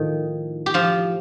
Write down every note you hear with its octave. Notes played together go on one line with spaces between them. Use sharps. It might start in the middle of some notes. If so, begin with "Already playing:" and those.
Already playing: A2 D#3 F3
G4
F3 F4